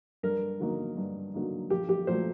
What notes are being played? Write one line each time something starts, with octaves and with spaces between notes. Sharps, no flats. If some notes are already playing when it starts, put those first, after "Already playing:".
G2 A#4
D3 F#3 A#3 D#4
G2
D3 F#3 A#3 D#4
A#1 G4
G4
A#2 F#3 A3 C5